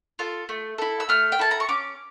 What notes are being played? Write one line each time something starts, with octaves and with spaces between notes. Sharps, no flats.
F4 A4
A3
E4 A4
E6
A3 F6
G5
E4 A4 A5
A#5
C#6
C#4 D6